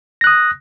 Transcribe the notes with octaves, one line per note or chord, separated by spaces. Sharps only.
D#6 F#6 A#6